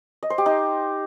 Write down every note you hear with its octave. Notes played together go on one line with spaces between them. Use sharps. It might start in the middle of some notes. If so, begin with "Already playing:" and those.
D#5
C5
G4
D#4